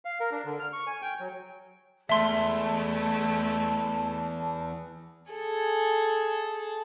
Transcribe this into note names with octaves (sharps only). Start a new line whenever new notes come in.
F5
A#4
D4
D3
F6
C#6
G#5
G5
F#3
E2 G#3 A3 E5 A5 C6
G#4 A4